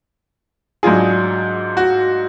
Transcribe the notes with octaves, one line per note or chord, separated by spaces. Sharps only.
G#2 F#3 D4 F4 G#4
F#4